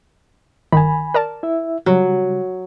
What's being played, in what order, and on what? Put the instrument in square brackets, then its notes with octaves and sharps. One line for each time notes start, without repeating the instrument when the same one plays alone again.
[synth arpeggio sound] G1 D#3 [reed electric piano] G#5 B5
[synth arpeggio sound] A#4 D5 A5
[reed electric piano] E4 E5
[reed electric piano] C#3 G3 [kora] F#3